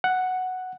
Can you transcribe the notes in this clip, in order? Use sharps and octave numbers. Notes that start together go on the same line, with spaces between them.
F#5